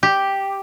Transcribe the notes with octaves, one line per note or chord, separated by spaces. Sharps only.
G4